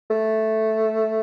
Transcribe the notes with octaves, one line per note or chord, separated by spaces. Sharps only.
A3